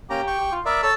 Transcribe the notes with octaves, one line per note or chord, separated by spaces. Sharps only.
A#3 C#4 G4 A#5
G5 C#6
G4
F4
B3 A#4 D5 E5
A4 C#5 A5 E6